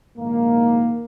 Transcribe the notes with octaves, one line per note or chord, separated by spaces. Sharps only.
A#1 G#2 D#3 G#3 A#3